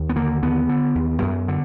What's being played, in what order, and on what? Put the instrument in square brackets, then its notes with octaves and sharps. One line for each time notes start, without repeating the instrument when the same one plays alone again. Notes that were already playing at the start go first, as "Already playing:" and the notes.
Already playing: [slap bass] D#2
B3
D3 A#3
D#2 B3
D3
D#2
F#2
D3